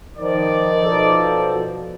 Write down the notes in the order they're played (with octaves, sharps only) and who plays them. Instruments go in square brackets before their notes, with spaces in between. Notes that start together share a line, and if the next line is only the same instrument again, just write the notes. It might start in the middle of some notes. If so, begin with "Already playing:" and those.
[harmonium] D#3 [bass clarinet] F3 [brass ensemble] D#4 D5
[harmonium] B2 F3 [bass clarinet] A4